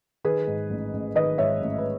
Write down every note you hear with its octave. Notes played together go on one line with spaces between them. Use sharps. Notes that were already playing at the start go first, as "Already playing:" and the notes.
D#3 G#4 B4
G#2
A1
A1
D#3 B4 D#5
G#2 C#5 E5
A1
B4